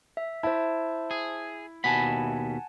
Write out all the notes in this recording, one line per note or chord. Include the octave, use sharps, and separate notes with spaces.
E5
E4 C5 A5
G#4
D#2 B2 F#5 G#5 A5 B5